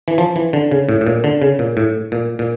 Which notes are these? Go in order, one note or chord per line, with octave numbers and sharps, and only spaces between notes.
E3
F3
E3
D3
C#3
A2
A2
A#2
D3
C#3
A#2
A2
A#2
A#2